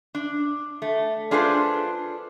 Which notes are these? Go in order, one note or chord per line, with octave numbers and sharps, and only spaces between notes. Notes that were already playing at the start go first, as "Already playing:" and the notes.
D4
A3
D4 F4 G#4 A4 B4 C5